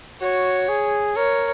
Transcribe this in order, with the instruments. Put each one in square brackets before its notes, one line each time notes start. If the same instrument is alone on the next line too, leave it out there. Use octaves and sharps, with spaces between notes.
[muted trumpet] F#4 [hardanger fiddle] C#5
[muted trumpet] G#4
[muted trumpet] A#4 [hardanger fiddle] C#5